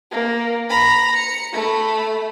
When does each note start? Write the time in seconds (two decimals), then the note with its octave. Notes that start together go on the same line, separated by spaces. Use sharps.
0.12 A#3
0.70 A#5 B5
1.16 C#7
1.53 A3 B5